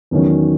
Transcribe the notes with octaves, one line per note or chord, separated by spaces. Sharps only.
E2 D#3 F#3 C#4